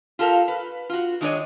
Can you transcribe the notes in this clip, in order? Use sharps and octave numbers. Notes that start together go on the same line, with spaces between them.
F4 G4 A4 A#4 F5
B4
F4 F#4
D#3 G#3 D4 G#4 C#5 D#5